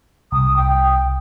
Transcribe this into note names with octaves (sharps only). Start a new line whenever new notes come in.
C2 D#6
G5